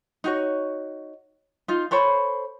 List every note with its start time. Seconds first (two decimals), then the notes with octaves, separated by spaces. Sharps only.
0.24 D#4 F#4 C#5
1.68 D#4 F4
1.91 A4 C5 C#5 B5